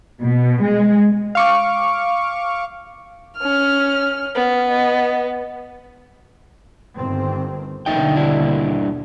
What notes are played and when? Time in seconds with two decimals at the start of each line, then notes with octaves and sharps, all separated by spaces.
0.21 B2
0.63 G#3
1.35 F5 C#6 D6
3.38 C#4 F6
4.35 B3
4.69 D#5
6.95 G1 D#3 C4
7.86 D#2 B2 D3 D#4 E5 G5
8.15 G2 D4 E4